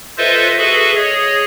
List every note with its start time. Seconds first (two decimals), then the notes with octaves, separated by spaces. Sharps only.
0.18 F4 A4 B4 C5 D#5 E5
0.58 F#4 G#4 A4 B4 E5
0.96 G#4 C#5 D#5